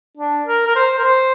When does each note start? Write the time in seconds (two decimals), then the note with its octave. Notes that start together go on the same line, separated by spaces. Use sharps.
0.17 D4
0.46 A#4
0.67 A#4
0.76 C5
0.98 A#4
1.04 C5